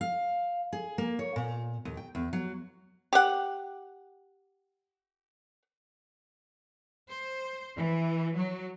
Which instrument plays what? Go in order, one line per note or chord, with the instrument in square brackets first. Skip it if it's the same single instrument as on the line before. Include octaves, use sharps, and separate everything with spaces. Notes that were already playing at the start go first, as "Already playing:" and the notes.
[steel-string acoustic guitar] F5
G#4
A#3
C#5
A#2
D#2
G5
E2
F#3
[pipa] G4 F#5
[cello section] C5
E3
F#3